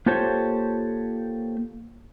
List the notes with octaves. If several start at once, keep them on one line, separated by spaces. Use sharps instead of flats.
A#3 F4 G4 A4 C5 C#5